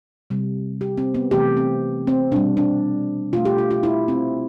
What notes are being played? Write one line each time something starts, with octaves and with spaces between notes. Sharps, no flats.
C3 G3
G4
C4
B3
C3 E3 A3 G4
C4
C4
B2 G3 D4
D4
B2 A3 F4
G4
F4
F4
E4
C4